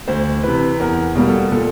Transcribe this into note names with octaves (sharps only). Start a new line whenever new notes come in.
D2 C5
C3 E3 B4
E2 A#4
B2 G3 A#3
A4
A#2 A4